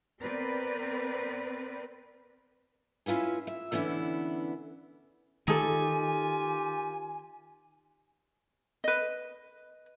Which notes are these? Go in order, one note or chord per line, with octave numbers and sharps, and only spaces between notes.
B3 C4 A#4 B4 D5
C#4 E4 F4 B4 G#5
E5
D3 E3 B3 C#4 E4
D#3 A#3 D#4 F4 G4 A4 G#5
B4 D#5